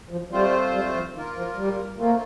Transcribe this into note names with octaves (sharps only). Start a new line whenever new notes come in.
F3
G3 A3 C4 F4 C5
G3
F3
D#3 A#3 F4 A#4
F3
G3
D3 A3 A#3 C4 F4